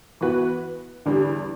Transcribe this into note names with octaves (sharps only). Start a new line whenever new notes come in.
E3 B3 F#4 B4
E2 D3 G3